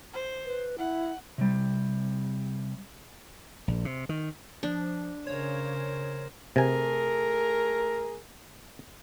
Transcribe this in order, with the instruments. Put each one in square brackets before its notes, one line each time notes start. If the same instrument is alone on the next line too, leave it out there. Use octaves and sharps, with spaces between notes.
[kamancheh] C5
[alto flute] B4
[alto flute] E4 [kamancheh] F#5
[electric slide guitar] C3 G3
[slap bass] A#1
C3
D#3
[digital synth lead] F3 [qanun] D4
[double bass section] C#3 [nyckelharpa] A#4 C5 [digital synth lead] C#5
[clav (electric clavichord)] C3 G#5 [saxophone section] A3 G#4 A#4